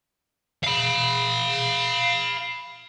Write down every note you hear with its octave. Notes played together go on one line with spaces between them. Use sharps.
F5 B5